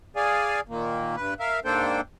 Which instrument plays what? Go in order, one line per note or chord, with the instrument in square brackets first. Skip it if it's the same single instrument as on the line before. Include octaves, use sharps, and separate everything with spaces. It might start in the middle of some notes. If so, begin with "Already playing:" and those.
[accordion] G#4 D5 F5 G#5
A#2 D#3 A#3
G2 B4
A#4 E5 F5
G#2 A#3 D4 A4 C5 G5